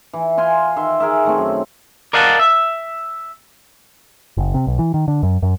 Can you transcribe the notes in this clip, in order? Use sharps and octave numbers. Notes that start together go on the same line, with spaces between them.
E3
F4 F5 G#5 C6
D#3 E5 C6
G#4 A#4 E5
D#3 A3 C4
F#2
A#4 D5 D#5 F5 F#5 A5
E5
F#1
C3
B1
E3
D#3
D3
F#2
F#2